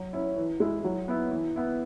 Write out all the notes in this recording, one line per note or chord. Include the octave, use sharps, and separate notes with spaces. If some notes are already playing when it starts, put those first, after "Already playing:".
Already playing: F#3
C#4 E4
E3
G#3 E4
F#3
B3 E4
E3
B3 E4